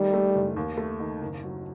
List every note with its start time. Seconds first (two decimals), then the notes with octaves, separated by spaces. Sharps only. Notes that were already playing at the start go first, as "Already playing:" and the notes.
Already playing: D#3 G3 A3
0.13 A3
0.35 F#1
0.56 D#2
0.77 A3
1.00 D#3
1.21 F#1
1.44 F#3